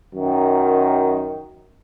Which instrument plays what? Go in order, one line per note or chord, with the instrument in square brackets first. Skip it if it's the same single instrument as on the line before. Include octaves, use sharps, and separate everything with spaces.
[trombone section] F#2 D#3